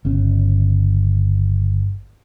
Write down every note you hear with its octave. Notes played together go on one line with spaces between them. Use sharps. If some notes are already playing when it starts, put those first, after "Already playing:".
G1 C#3 C#4